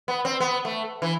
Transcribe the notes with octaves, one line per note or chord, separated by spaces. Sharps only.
B3
C4
B3
A3
E3